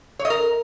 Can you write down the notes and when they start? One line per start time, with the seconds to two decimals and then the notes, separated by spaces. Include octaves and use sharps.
0.19 C#5
0.25 D#5
0.30 A#4